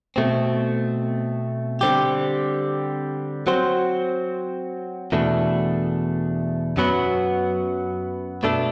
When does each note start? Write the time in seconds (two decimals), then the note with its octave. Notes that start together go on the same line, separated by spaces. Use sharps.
0.16 B2 A3 C4
1.81 D3 G3 C4 G4
3.47 F#3 C4 F#4 C5
5.12 E2 B2 A3 D4
6.77 F#2 F#3 B3 F#4 B4
8.43 B2 A3 D4 A4